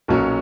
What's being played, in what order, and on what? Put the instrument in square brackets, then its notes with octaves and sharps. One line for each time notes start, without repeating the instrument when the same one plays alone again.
[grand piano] B1 A#2 F#3 C#4